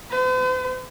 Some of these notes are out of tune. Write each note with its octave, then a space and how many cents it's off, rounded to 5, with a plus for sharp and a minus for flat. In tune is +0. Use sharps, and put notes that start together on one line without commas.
C5 -45